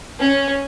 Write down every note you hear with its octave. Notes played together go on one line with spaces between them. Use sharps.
C#4